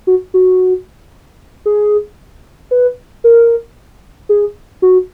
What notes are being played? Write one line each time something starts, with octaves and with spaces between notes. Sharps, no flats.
F#4
F#4
G#4
B4
A#4
G#4
F#4